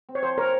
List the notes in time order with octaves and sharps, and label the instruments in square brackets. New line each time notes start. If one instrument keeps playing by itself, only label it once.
[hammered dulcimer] C4
[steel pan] C#5
[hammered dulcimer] F3 [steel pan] C5
[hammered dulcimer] C3 [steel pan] A#4 C#5